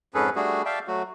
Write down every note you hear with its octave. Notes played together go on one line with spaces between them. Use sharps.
F2 G#2 C#4 G#4 A4 B4
G3 A3 D4 F#4 G#4
D5 E5 F5 G5 A5
F#3 A3 F#4